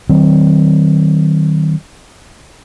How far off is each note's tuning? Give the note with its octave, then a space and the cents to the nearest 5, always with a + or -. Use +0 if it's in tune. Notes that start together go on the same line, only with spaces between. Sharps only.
D#3 +0 F#3 +45 C4 +0